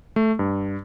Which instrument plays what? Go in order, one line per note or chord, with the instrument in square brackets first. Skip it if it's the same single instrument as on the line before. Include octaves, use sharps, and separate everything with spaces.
[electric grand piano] A3
G2